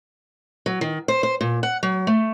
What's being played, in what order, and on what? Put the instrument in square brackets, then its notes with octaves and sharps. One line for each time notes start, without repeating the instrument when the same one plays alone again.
[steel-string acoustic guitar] F#3
D#3
C5
C5
A#2
F#5
F#3
A3